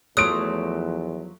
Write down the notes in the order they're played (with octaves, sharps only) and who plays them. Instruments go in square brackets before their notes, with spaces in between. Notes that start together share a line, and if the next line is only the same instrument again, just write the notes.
[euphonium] E2 [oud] F3 F#3 A3 [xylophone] D#6 [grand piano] F#6 D7